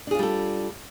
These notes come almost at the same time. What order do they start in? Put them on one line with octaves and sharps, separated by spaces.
D4 G#4 F4 G3 A4